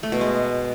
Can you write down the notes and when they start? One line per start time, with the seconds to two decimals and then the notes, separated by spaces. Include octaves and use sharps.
0.03 A3
0.12 B2
0.21 G#3